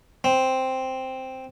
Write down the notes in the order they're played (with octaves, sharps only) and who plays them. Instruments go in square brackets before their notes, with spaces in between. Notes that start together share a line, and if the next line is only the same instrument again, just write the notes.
[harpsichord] C4